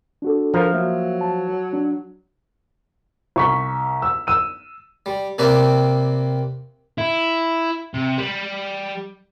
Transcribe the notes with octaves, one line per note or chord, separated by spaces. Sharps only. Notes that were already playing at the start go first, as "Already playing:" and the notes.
D4 F#4 A4
F3 A#4 A#5
F#3 A#3 E5
A5
D4
C2 C#6 B6
E6
E6 D#7
G3
C3 A#3 C4 B4 D5 G5
E4
C3
G3